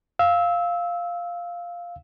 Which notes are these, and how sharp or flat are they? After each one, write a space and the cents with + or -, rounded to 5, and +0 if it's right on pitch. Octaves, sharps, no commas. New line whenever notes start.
F5 +0 E6 -20